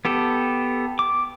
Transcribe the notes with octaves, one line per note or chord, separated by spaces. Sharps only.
B3 G4 A4
D6